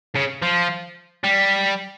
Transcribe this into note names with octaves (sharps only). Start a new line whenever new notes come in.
C#3
F3
G3